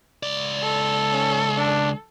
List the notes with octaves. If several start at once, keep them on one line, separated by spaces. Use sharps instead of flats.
C#2 D5
A4
C#4
D4